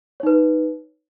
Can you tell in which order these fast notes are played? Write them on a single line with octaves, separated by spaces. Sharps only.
C#5 D#4 B4